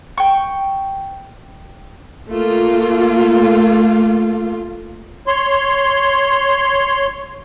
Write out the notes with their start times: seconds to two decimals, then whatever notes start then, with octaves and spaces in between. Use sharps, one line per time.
0.17 G5 C#6
2.29 A3 A#3 F4
5.27 C#5 C6